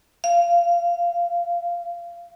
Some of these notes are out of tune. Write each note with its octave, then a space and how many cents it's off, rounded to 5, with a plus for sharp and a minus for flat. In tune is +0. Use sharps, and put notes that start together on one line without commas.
F5 -20